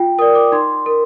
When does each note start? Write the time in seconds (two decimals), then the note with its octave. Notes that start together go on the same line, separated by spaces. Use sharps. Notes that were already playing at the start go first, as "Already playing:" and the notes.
Already playing: F4 G5
0.19 A#4 D5 D#6
0.35 D6
0.52 D#4 C6
0.86 A#4